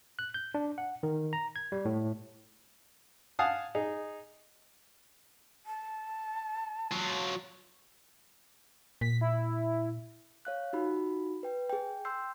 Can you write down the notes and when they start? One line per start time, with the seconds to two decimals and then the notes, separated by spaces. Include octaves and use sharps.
0.19 F#6
0.34 G6
0.55 D4
0.78 F#5
1.03 D#3
1.33 A#5
1.56 G#6
1.72 G3
1.85 A2
3.39 F5 F#5 G#5 A5 D#6
3.75 D#4 G#4
5.66 A5
6.92 F#3 F4
9.01 A#2 B6
9.21 E4
10.45 C#5 F5 F#6
10.73 D#4 F4 F#4 B5
11.43 B4 G5
11.69 G#4 G5
12.05 G5 C6 E6 G6 C7